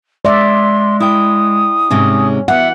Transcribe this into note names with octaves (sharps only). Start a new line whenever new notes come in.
G#3 D5 E5 C6
E4 G5 D#6
G#2 C3 G#3 C#4
E3 B3 E5 F#5